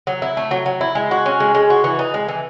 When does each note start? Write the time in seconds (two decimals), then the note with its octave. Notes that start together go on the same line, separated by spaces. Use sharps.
0.07 F#3
0.22 E4
0.37 A3
0.51 F#3
0.66 F#3
0.81 E4
0.95 G#3
1.11 F#4
1.26 C#4
1.40 G#3
1.55 G#3
1.70 F#4
1.84 E3
1.99 D#4
2.14 G#3
2.28 E3